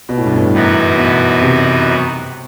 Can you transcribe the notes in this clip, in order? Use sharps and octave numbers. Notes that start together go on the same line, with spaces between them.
B2
A2
G2
A2
F#2 E3 B3 D#4 F#4
B2
C3